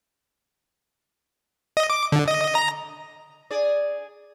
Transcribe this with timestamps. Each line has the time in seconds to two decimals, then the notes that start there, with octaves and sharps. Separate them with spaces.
1.77 D#5
1.90 D6
2.12 D3
2.28 D#5
2.55 A#5
3.51 G#4 D5